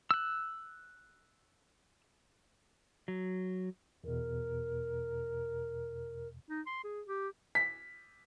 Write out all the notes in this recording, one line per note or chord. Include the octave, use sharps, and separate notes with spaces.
E6 F#6
F#3
E2 B2 A#4
D#4
C6
G#4
G4
B6